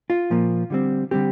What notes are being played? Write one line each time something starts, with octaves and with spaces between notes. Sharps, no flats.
F4
A#2 F3 A#3
D3 G3 C4
D3 G3 C4 G4